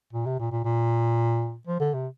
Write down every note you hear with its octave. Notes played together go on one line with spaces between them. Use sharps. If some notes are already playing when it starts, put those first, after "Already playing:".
A#2
C3
A#2
A#2
A#2
F3
D3
C3